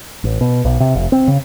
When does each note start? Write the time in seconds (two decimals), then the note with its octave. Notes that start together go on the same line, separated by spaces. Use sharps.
0.24 A1
0.41 B2
0.65 B1
0.80 C3
0.95 F1
1.12 C4
1.28 C#3